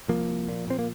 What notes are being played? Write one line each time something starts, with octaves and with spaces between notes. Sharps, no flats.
C2 F3 A#3
C2
A#2
A#2 C4
A#3